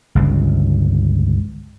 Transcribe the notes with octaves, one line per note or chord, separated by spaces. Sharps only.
G1 C#2